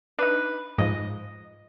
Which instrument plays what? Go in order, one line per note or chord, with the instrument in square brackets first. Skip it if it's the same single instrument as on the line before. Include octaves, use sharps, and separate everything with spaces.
[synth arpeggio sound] D4 D#4 [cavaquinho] B4
[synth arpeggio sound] G#2 F3 [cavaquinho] D#5